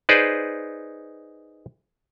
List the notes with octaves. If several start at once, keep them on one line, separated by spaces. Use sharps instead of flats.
D#4 G#4 B4 C5 D5